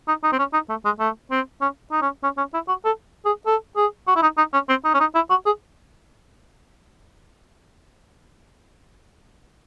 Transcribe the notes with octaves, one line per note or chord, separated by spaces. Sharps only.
D#4
D#4
C4
C#4
D#4
A3
G#3
A3
C4
C#4
D#4
C#4
C#4
C#4
E4
F#4
A4
G#4
A4
G#4
F#4
E4
D#4
D#4
C#4
C4
D#4
C#4
D#4
E4
F#4
G#4